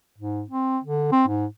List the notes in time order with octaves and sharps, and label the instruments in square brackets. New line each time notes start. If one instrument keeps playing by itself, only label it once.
[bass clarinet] G#2
C4
D3
C4
G#2